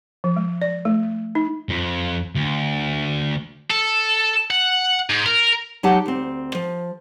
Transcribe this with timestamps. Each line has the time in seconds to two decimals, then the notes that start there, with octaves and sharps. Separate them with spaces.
0.24 F3
0.36 G#3
0.62 D5
0.85 A3
1.35 D#4
1.69 F2
2.35 D2
3.71 A4
4.50 F#5
5.10 G#2
5.26 A#4
5.83 F#3 D#4 G4 F#5 A5
6.06 D2 C4
6.55 F3